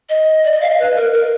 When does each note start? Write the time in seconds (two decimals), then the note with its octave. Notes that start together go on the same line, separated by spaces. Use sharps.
0.09 D#5
0.45 D5
0.52 D#5
0.62 F5
0.70 D#5
0.79 B4
0.96 A#4
1.13 A#4